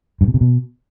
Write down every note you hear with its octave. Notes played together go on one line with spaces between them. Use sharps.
G2
B2
C3
B2